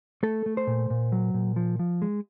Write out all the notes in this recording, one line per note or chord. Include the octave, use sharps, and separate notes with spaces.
A3 A4
A3
C5
A#2
A#2
F#3
A#2
F3
F3
G#3